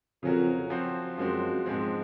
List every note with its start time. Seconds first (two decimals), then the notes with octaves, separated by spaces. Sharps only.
0.23 F2 C#3 F#3 C#4 F#4 A#4
0.70 F3 C4 F#4 C5
1.18 F#2 F3 G#3 C4 F#4
1.66 G#2 F3 G#3 C4